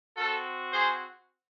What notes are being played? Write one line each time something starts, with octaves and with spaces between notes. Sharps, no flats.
C4 F#4 A4
G#4 C5